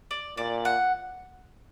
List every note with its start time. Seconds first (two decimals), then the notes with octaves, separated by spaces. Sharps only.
0.11 D5
0.37 A#2 D5
0.65 F#5